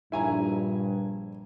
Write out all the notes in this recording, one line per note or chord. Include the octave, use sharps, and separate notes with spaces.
A#1 G2 E4 G#5 A#5